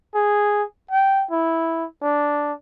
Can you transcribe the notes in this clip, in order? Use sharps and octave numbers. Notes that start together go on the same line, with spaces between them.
G#4
G5
E4
D4